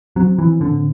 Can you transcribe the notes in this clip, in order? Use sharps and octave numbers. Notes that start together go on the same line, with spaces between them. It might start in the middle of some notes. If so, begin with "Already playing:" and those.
F#3 C4
E3
A2 D3